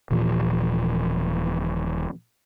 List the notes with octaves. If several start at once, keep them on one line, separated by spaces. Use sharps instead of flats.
D#1 A#2 E3 F3